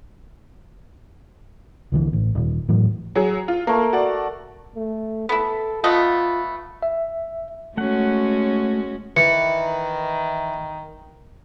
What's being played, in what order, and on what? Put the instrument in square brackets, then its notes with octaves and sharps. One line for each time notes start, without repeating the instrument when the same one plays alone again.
[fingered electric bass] C2 D3 E3
A1
D#1
A2 E3 F#3
[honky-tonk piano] F#3 G#4
F4
[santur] A3 A#4 [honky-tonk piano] A#3
[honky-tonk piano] F#4 D5
[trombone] A3
[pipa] B3 E4 [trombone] A4
[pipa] A3 B3 D#5 [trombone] F4
[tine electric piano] E5
[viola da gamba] G#3 C#4 F#4 [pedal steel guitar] A3 F#5
[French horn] D#3 [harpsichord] E3 [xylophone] C#7